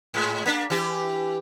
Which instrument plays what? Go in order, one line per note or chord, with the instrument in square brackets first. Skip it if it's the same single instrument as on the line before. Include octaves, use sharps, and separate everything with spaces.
[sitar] G#2 G#3
A#3 D4
E3 G4